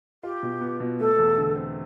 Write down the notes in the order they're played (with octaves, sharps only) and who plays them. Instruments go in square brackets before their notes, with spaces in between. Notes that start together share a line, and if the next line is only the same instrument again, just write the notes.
[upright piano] F4 [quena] G4
[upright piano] B2
B3
B2
[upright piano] A3 [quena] A4
[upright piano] E2
D3
C4